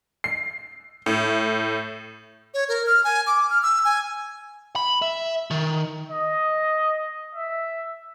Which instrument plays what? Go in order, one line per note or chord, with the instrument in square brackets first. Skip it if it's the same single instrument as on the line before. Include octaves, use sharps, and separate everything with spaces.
[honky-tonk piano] C7
A2
[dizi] C#5
A#4
F6
G#5
D6
F6
E6
G#5
[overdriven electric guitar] B5
E5
D#3
[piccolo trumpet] D#5
E5